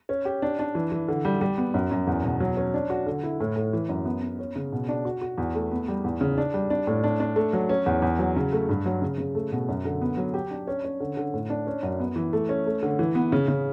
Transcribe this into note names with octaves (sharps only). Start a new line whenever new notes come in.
C#4
G4
D4
D4
E3
E3
D3
G3
G3
B3
F#2
F#2
E2
B2
F#3
C#4
D4
F#4
D3
E4
A2
A2
E3
F#2
B3
B3
C#4
C#3
B2
D4
F#4
F#4
E2
A3
B3
G3
E2
C#3
D4
G3
D4
A2
D4
D4
A3
F#3
C#4
E2
E2
F#3
C#3
A3
G2
F#3
C#3
C#3
A3
B2
F#2
D3
B3
F#3
G4
D4
C#4
C#4
D3
D3
A2
D4
C#4
F#2
B3
E3
A3
C#4
A3
D3
E3
B3
C#3
C#3